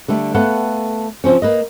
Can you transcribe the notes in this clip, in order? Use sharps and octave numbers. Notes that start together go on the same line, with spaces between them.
D3 G3 A3
A3 B3 A4 F5 F#5
C#3 F3 C4 C#4
A#3 B4 D#5